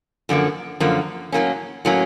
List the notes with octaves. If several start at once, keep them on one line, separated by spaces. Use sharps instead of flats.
F#2 D3 F3 A#3
F#2 D3 F3 A#3
A2 F#3 A#3 C#4
A2 F#3 A#3 C#4